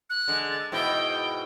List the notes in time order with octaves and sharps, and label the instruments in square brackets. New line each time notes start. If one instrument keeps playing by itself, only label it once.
[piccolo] F#6
[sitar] D3 G#3
[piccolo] A6
[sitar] G#2 B2 E4 [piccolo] G5